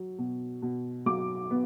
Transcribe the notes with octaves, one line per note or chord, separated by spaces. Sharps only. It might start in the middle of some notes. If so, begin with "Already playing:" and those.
Already playing: F#3
B2
B2
F#3 D6
B3